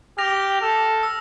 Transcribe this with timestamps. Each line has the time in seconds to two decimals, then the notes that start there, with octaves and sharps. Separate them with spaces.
0.18 G4 F6 A#6 F7
0.62 A4
1.03 E6